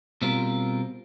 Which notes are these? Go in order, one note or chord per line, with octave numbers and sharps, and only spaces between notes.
B2 G3 C4 F4 A#4